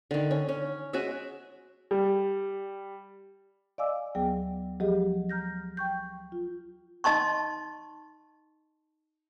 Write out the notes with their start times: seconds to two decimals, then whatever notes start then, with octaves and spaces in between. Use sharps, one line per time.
0.11 D3 D#3
0.31 C#4
0.49 C#4
0.93 G#3 C#4 F#4 E5
1.91 G3
3.78 D5 D#5 F5 G#5 D6 E6
4.15 D2 F#3 B3 G#4 G5
4.80 F3 F#3 G#3 G4 G#4 D#5
5.29 A#5 F6 G6 A#6
5.77 G5 C#6 G6
6.32 F4
7.04 D#4 D#5 A5 C6 C#6